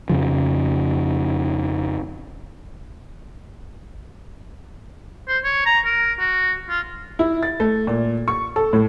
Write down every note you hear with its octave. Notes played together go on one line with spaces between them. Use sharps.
F2 C#3 F3
C5
C#5
A#5
A#4
F#4
F4
E4
A6
A3
A#2
C#6
A4
A2